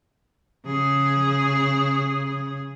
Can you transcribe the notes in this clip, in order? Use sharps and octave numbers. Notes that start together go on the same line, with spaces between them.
C#3 G#4